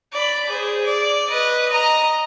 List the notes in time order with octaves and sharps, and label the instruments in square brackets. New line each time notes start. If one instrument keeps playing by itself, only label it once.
[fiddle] D5 B5
G#4 C5
D5
B4 D#5
D#5 A#5